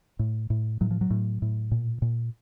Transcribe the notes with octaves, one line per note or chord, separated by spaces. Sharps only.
A2
A2
A2 F#3
F3
F#3
A2
A2
A#2
A#2